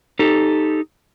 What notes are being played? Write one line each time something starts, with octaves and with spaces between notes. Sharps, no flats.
D#4 G4 A4